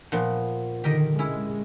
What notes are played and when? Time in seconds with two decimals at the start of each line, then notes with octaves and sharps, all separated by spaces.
0.12 A#2 F3 B3
0.84 D3 D#3 G4 A#4 D#5
1.19 G#3 C#4 E4